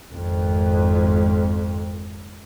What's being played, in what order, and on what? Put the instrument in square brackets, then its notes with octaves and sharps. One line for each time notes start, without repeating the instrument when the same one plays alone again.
[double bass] G#1 F2